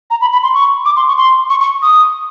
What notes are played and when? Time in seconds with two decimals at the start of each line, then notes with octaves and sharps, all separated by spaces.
0.11 A#5
0.21 B5
0.32 B5
0.43 C6
0.54 C#6
0.86 D6
0.96 C6
1.08 C#6
1.17 C6
1.50 C#6
1.61 C#6
1.82 D#6